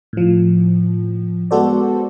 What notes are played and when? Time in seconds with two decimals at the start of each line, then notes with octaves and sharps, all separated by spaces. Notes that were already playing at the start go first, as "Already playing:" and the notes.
0.13 A2 F3
1.51 G#3 B3 F#4 A4 C5 D5